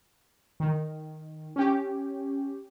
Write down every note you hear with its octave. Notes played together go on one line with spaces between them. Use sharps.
D#3
C#4 G4